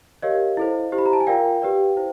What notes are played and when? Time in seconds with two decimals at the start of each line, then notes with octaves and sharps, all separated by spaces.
0.22 G4 A#4 C#5 D#5 F5
0.57 E4 A4 C5
0.92 E4 G4 C5
0.98 B5
1.06 A#5
1.13 A5
1.20 G#5
1.27 F4 A#4 D5 F5 G5
1.62 G4 B4 D5
1.97 E4 C5